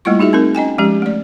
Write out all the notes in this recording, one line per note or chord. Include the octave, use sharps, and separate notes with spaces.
G3 A3 A#3 E4 F4 C#6
D#4 F#4 G#4 E5
C4 D#4 A#4
C#4 D#5 G5 G#5
F3 G#3 C#4 G4
A3 D5